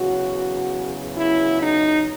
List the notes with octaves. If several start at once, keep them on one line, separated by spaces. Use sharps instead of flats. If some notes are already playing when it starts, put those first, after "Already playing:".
Already playing: E2 C#3 F#3 F#4
E4
D#4